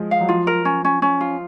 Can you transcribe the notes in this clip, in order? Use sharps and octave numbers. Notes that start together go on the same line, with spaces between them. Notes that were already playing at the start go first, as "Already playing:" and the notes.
Already playing: F3 G#3
F5
F#3
F3 F4
A#4
C#4
C#4
C#4
F4